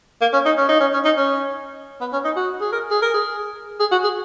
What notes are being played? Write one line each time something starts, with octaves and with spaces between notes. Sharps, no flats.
A#3
C#4
D#4
C#4
D#4
C#4
C#4
D#4
C#4
B3
C#4
D#4
F#4
G#4
A#4
G#4
A#4
G#4
G#4
F#4
G#4